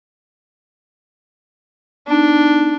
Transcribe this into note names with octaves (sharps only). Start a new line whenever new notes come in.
B3 D4 D#4